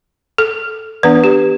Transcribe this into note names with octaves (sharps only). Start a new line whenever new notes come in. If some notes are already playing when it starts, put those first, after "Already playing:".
A4
E3 B3 D4 B4
G4